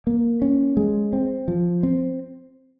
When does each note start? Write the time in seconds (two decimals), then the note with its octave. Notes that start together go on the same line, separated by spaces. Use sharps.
0.07 A#3
0.42 C#4
0.77 G#3
1.13 C4
1.48 F3
1.83 C4